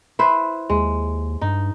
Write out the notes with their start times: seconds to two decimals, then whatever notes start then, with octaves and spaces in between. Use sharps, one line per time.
0.19 E4 B4 C5
0.70 D#2 G#3
1.41 G2 D#4